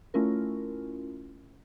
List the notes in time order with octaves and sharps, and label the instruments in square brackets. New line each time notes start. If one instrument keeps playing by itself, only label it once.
[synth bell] A3 C#4 E4 F4 A#4